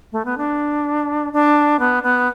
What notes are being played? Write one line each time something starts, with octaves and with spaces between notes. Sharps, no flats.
A3
B3
D4
D4
B3
B3